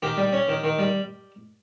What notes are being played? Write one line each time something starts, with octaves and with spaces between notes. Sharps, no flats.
D#3 G4
G3
C#4
D#3
D#3
G3